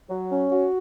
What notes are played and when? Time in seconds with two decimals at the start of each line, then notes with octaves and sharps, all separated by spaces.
0.10 F#3
0.31 C#4
0.51 F#4